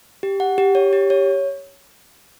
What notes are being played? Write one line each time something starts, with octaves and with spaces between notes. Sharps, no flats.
G4
F#5
G4
C#5
G4
C#5